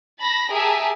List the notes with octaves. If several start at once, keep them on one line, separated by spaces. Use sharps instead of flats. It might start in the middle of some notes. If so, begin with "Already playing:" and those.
A5 B5 A#6
G4 G#4 A#4 E5 G#5 A5